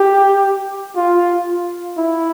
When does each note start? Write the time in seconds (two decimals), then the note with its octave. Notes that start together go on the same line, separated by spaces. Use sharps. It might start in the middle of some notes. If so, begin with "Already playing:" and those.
Already playing: G4
0.96 F4
1.98 E4